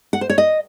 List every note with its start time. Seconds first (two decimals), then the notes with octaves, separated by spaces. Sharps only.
0.13 F#5
0.21 C5
0.30 C#5
0.38 D#5